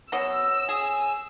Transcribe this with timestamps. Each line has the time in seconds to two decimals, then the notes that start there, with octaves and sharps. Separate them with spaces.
0.12 B2 F#3 C#5 D#6 E6 A#6
0.69 G#4 G#5